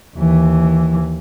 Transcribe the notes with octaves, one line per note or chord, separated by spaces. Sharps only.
D#2 E3